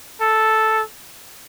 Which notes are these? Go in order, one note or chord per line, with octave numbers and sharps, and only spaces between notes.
A4